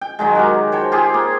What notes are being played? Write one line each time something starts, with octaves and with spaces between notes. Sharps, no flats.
G5
D#3 F#3 G#3
F#4 G4 A#4
C5 C#5 G5 A5
F4 G4 G#4
A#3